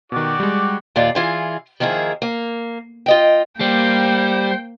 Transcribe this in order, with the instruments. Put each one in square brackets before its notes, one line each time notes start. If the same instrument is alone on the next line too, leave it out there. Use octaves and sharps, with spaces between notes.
[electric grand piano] B2 D#3 [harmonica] F#4 G4 D5
[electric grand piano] G3 G#3
[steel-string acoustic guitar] D#2 A#2 F4 D5
E3 F4 G#4
D#3 F3 A#3 E4 G#4
A#3
F4 D#5 G5
[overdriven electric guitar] G3 [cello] A#3 [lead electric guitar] C5 [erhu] G5